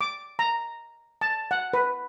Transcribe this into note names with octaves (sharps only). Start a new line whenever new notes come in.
D6
A#5
A5
F#5
B4